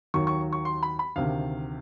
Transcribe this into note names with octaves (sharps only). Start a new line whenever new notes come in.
D#2 D#3 F#3 C#6
C#6
C#6
C6
B5
B5
D2 C3 D#3 F5